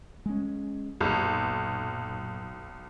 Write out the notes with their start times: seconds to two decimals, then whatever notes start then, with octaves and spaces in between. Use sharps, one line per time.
0.26 G#3 C#4
1.01 B1 F#2 A#2